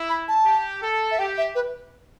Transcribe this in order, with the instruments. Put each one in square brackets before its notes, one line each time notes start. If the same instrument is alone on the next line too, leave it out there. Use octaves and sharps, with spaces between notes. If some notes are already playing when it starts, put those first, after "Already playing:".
Already playing: [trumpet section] E4
[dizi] B5
A5
[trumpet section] G4
A4
[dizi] E5
[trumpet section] G4 [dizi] G5
[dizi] E5
B4